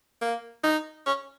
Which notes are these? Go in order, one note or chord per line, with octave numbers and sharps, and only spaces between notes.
A#3
D#4
C#4